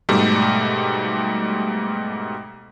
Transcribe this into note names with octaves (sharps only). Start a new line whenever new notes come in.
G#2 B2 G3 A3